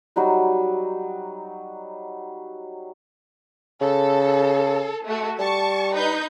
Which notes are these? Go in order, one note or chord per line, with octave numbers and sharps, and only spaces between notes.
F#3 G3 D#4 F#4
C#3 A4
A3 F#4
G3 A5 C#6
D#4 B4 G6